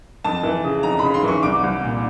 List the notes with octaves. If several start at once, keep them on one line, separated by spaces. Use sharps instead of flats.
F2 A5
E3
C#3
F2 A#5
C#3 B5
C6
E3 C#6
C2 D6
C2
A#2